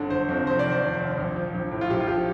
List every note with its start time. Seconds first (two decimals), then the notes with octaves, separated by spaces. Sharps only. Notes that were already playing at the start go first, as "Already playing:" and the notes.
Already playing: G1 D3
0.10 G1 C5
0.29 F2
0.47 F1 C5
0.59 D5
0.65 D#3
0.72 C5
0.82 F1
1.00 D#2
1.18 A#1
1.36 F3
1.54 A#1
1.71 A2
1.81 F4
1.90 A#1 G4
2.00 F4
2.07 F3 G4